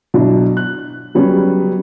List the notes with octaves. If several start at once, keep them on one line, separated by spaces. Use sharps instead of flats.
B2 F#3 D4 E4
F#6
C#3 F#3 G3 B3 C#4